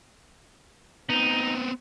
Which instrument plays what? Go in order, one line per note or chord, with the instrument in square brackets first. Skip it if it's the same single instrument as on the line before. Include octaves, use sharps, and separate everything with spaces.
[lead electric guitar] B3 C4 [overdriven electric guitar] D#4